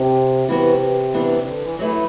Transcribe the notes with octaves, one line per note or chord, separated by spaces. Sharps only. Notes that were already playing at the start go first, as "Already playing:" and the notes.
Already playing: C3
C3 E3 B3 F#4
E3 B3 D4
C3
D3
E3
E3 F#3 A3 E4 B4